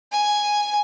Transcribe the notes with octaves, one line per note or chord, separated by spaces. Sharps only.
G#5